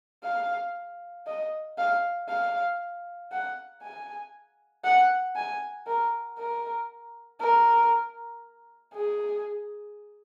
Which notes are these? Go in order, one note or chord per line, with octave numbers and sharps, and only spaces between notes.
F5
D#5
F5
F5
F#5
G#5
F#5
G#5
A#4
A#4
A#4
G#4